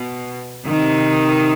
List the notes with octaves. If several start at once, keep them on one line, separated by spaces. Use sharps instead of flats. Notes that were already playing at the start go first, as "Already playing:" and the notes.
Already playing: B2
C3 D#3